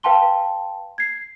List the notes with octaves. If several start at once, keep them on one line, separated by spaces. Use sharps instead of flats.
B4 F5 G5 A5 C6 G7
G#6 C7